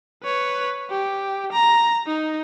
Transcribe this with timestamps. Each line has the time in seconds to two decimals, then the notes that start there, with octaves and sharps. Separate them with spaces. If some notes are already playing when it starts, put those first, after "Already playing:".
0.23 B4 C#5
0.90 G4
1.52 A#5
2.06 D#4